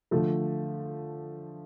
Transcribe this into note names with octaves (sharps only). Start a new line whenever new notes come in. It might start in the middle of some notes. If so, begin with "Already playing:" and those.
D3 F3 A3